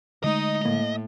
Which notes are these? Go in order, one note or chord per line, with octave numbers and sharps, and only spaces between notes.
D3 G#3 A3 D#4 D#5
A2 A#3